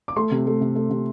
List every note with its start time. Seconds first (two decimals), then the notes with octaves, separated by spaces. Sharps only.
0.08 D6
0.16 A3 C6
0.31 C3
0.47 A3
0.61 C3
0.75 A3
0.90 C3